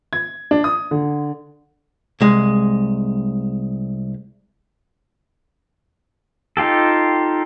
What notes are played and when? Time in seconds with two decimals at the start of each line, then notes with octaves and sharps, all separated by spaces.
0.13 G#6
0.51 D4
0.64 D#6
0.91 D3
2.21 C2 G#3
6.57 D#4 F4 G4 A4